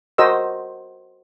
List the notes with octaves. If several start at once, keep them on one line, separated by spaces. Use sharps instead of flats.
F#4 A#4 C5 D#5 E6